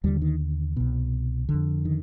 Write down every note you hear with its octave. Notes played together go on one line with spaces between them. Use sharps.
D#2 D3 G3
D#3
C2 B2
D3
F2
D#3